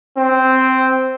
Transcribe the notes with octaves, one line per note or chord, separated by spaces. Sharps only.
C4